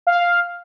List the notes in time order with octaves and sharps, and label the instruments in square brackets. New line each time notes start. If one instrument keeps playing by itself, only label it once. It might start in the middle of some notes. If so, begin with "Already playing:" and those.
[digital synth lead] F5